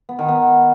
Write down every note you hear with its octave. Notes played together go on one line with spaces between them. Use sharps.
B3
D#3
B3